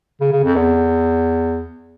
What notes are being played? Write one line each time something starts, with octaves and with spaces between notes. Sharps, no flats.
C#3
C#3
F2
E2